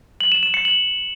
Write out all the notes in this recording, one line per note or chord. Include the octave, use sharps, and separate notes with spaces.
F#7
E7
E7
C#7
F#7